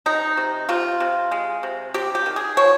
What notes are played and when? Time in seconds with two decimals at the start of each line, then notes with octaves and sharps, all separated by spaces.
0.06 C3 D#4
0.37 C3
0.69 C3 F4
1.00 C3
1.31 G#3
1.63 C3
1.94 C3 G4
2.15 G4
2.26 D#3
2.36 G#4
2.57 F3 C#5